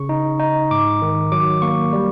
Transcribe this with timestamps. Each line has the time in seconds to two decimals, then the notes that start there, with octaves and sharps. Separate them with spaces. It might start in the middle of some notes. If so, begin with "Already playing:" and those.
Already playing: C#3 C#6
0.09 D#4
0.39 D#4
0.71 G#2 D6
1.02 D#3
1.32 F#3 D6
1.62 A#3 C#6
1.93 G3